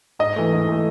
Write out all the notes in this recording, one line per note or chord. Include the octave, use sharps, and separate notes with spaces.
G#2 D#5
E3 A3
G#2
E3 A3